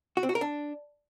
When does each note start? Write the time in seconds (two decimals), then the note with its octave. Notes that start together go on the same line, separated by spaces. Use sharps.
0.17 F#4
0.23 C4
0.29 F#4
0.35 A#4
0.41 D4